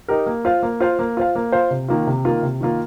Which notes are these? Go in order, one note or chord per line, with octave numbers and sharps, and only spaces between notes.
D#4 G4 A#4
A#3
F4 C5 F5
A#3
F4 C5 F5
A#3
F4 C5 F5
A#3
F4 C5 F5
C3
D#3 A#3 F4
C3
D#3 A#3 F4
C3
D#3 A#3 F4